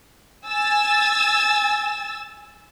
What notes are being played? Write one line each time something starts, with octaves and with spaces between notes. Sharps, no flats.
G#5 E6 A6